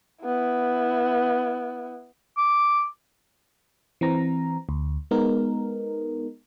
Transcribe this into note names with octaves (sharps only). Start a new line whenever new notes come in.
B3 E4
D6
E3 C4 A#5
D2
G#3 B3 D#4 A#4